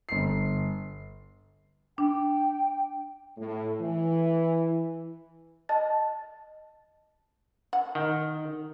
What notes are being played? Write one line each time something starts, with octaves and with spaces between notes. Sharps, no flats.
G1 C7
D4 G5
A2
E3
D#5 A5 A6
F#5
D#3